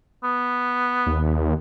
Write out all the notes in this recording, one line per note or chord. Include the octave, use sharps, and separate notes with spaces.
B3
D#2